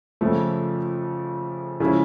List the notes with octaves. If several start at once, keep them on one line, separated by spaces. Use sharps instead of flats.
F2 C#3 F3 A3
C#3 F3 G#3 C#4 E4